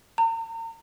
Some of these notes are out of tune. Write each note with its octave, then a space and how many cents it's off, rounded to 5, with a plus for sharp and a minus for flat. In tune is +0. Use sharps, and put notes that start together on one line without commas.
A#5 -40